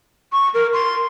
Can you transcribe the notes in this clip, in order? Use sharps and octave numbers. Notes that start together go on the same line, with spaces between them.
C#6
A#4
C6